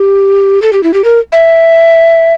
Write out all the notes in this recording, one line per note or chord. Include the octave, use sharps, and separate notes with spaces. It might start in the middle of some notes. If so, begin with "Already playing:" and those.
Already playing: G4
A4
G4
E4
G4
A#4
E5